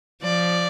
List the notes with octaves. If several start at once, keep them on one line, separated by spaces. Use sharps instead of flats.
F3 D5